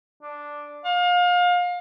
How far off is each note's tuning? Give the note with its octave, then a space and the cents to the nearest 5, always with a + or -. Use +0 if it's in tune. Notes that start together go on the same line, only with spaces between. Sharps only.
D4 +0
F5 +30